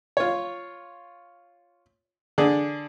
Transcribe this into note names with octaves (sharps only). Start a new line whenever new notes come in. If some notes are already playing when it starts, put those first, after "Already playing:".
F4 C#5
D3 G#4 D5